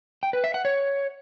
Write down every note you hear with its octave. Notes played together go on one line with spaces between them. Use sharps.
G5
B4
E5
F#5
C#5